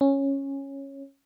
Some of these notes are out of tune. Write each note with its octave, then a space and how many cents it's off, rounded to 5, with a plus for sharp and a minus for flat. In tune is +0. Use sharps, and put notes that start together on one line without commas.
C#4 -10